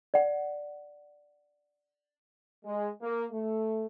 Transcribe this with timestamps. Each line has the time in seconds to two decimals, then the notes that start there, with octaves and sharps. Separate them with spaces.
0.14 D5 F#5
2.65 G#3
3.01 A#3
3.32 A3